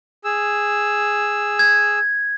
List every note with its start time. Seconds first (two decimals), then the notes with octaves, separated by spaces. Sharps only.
0.24 G#4 E6
1.59 G#6